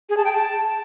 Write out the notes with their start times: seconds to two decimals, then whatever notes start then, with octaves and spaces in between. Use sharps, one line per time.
0.10 G#4
0.17 A5
0.25 G5
0.32 A5